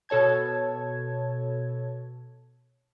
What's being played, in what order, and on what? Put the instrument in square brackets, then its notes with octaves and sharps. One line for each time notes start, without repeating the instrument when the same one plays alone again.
[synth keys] B2 A4 C#5 A5 G#6